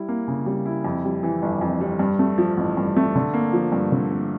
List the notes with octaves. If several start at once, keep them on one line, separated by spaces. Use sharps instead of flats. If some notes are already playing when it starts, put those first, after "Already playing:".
Already playing: G3 E4
A#3
C#3
G3
E4
F2
G3
E3
G1
F2
G3
G2
A3
F3
A1
G2
A3
D3
A#3
F3
G2
D3
A#3